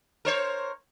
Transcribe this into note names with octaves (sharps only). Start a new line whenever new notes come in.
A#4 C5 C#5